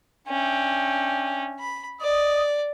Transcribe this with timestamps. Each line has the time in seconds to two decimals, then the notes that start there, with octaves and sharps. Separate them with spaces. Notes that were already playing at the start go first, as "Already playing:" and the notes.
0.28 C#4 D4 E5 G5
1.59 B5
2.01 D5 D#5 D#6